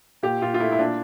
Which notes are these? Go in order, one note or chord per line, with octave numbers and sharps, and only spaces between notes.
A#2 G4
A#2 F4
F4
A3 E4
E4
A#2 D4